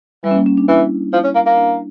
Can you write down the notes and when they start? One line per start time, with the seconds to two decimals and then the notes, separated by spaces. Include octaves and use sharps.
0.24 E3 G3
0.31 C#4
0.36 A#3
0.46 C#4
0.57 D4
0.68 E3 E4
1.12 F3 E4
1.24 C#4
1.35 A#3
1.46 A#3
1.57 D4